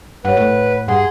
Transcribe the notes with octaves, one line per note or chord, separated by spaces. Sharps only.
G2 B4 C#5 F#5
A2
G2 G#4 F#5 C6